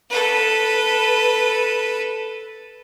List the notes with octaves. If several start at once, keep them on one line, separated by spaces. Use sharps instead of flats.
A4 B4